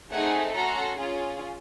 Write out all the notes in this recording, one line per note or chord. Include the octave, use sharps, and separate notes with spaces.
A3 C4 D#4 G#4 F#5 G#5
C#4 F#4 A4 A#5 C6
C#4 F4 G#4